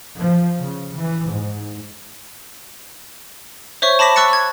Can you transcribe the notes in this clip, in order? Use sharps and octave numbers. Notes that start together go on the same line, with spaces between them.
F3
C#3
E3
G#2
C5 C#5 E5 C#6
A5 B5 D6 A#6 B6 E7
C#6 E6 F#6 A6 C#7
G#6